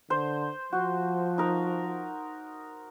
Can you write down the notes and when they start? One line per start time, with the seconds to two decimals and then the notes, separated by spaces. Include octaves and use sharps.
0.10 D3 C5
0.72 F3 F#4
1.38 D#4 A#4